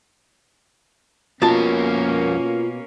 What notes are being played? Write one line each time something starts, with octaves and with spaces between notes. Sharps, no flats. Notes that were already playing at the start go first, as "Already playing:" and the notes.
F2 B2 A#3 C#4 F4 A#4 A5